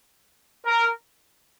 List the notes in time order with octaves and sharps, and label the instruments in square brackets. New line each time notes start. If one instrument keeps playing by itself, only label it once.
[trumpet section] A#4